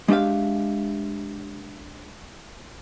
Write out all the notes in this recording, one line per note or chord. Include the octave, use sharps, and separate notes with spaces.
G#3 D4 G4 E5 F5